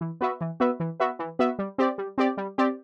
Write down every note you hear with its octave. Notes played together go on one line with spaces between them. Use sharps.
E3
B3 F#4 B4 E5
E3
B3 F#4 B4 E5
E3
B3 F#4 B4 E5
E3
B3 F#4 B4 E5
G3
C4 G4 D5
G3
C4 G4 D5
G3
C4 G4 D5